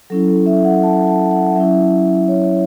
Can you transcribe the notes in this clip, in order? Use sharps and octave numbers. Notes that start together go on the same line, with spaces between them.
F#3 C#4 E4 A4
A4
E5
F#5
A5
A5
F#5
F#3 C#4 E4 E5
C#5